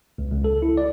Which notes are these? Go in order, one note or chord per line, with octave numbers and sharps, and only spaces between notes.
C#2
C#2
A4
E4
D5